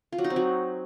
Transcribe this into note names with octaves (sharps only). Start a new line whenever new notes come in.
F4
F#3
D#4
C4
F#3